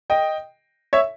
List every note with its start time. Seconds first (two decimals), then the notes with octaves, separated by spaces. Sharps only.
0.10 D#5 G5
0.93 C#5 E5